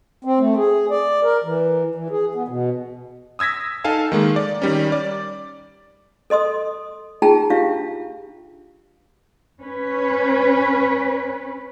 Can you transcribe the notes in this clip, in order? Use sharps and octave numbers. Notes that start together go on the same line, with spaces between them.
C4
A3
G#4
D5
A#4
E3
E3
G#4
B3
B2
D#6 E6 G#6 A#6 B6
D#4 A4 F5 G#5 A5
D#3 G#3 A#3
D5
D#3 G3 C#4
D5
A4 D#5 C6 D#6
D#4 F4 G#4 G5 A5 A#5
D4 F4 G4 E5 F5
C#4 B4